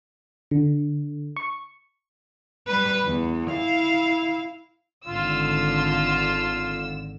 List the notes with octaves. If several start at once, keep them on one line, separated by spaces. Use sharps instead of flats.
D3
C#6
G3 B4
E2
E4 F5
G#1 D3 F4 E6